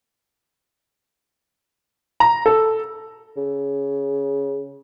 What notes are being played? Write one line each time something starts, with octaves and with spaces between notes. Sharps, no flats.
A#5
A4
C#3